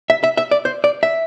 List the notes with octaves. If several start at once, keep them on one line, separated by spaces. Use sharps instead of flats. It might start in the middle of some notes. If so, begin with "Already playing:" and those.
E5
E5
E5
D5
C5
D5
E5